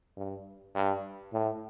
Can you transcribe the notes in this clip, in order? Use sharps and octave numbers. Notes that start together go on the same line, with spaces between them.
G2
G2
A2